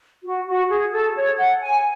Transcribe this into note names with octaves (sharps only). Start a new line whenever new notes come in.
F#4
F#4
G#4
A4
C#5
F#5
G#5